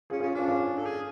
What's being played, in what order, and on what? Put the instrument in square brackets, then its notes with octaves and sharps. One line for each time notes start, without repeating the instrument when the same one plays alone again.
[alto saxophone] C#4 [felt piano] F4 G#4
[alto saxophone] C#4 [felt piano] F4 G#4
[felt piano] C#4 F4 [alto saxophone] D4
[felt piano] C#4 F4
[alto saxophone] A4
G#4